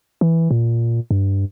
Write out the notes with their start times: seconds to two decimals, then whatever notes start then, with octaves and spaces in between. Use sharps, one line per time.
0.21 E3
0.51 A#2
1.11 G2